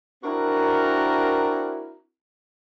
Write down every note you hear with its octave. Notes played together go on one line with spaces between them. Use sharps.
C4 D4 E4 F#4 A#4